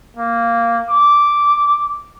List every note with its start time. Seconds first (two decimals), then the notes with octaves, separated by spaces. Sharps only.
0.17 A#3
0.90 D6